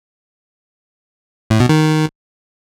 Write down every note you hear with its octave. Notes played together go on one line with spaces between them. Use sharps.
A2
B2
D#3